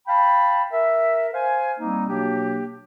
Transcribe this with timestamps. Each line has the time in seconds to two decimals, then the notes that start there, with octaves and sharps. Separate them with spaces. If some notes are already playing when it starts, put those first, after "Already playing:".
0.07 F5 G5 A5 B5
0.72 A#4 E5
1.33 C5 F5 G#5
1.79 G3 A#3 C4 D#4
2.08 B2 F#3 A#3 D4 G4